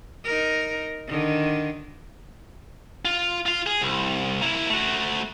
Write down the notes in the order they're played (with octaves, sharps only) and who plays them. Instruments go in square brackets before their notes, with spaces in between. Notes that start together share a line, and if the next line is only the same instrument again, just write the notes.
[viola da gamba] D#4 A#4
D3 D#3
[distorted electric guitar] F4
F4 F5
G#4
C2
A#3 E4
A3 F#4